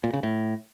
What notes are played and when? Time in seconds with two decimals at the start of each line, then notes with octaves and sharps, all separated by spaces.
0.04 A#2
0.13 C#3
0.23 A2